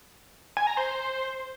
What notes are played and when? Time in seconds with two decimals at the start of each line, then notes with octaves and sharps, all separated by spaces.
0.57 G#5
0.67 A#5
0.77 C5